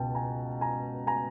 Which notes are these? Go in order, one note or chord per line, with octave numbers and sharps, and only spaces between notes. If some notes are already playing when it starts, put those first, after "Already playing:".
Already playing: C#2 B2 G5 A5
G#5 A#5
G#5 A#5
G#5 A#5